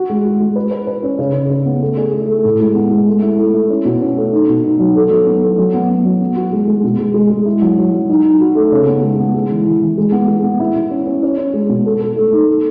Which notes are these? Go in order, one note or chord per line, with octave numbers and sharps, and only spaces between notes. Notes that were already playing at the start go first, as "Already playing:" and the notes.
Already playing: F#4
G#3
F#4
G#3
B4
B4
B4
C#4
C#3
C#3
C#3
B3
A3
G#4
A3
A3
A2
G#3
B3
G#3
A3
E4
A3
E4
C#4
B2
C#4
A3
D#4
B2
D#4
F#3
A4
F#3
B3
A4
F#3
B3
B3
F#3
B3
F#4
G#3
G#3
B2
G#3
G#3
G#3
E4
F#3
F#3
F#3
D#4
D#4
F#4
A3
C#3
B3
G#3
B3
G#3
E3
E3
E3
G#3
B3
G#3
B3
E4
E4
C#4
C#4
C#4
C#4
G#3
B2
A4
A4
A3
D#4
A4